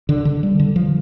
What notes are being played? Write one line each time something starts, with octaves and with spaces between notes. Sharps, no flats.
D3
D3
G3
D3
F3